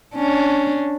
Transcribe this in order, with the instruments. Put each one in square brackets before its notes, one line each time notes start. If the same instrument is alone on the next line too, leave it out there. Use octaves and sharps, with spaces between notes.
[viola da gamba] C#4 D4